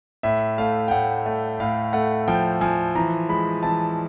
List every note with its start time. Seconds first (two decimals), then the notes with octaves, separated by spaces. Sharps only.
0.23 A2 E5
0.58 A3 F5
0.88 G5
0.91 A2 F#5
1.26 A3
1.60 A2 F5
1.93 A3 F#5
2.28 F3 G5
2.61 F3 G#5
2.95 E3 A#5
3.29 G#3 B5
3.63 E3 A5